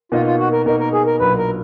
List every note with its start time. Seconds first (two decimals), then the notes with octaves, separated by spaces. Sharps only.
0.12 B2 A#3 D#4 F4
0.26 F4
0.39 F#4
0.52 A#4
0.66 B2 A#3 D#4 A#4
0.80 A#4
0.93 G#4
1.07 A#4
1.20 B1 A#2 F#3 D4 B4
1.38 A#4